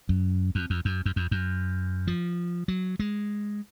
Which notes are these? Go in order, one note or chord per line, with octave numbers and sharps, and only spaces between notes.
F#2
F2
F2
F#2
F#2
F2
F#2
F3
F#3
G#3